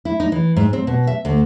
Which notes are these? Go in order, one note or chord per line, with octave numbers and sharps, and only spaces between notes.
E4
D#4
E3
G#2
C4
B2
E5
D2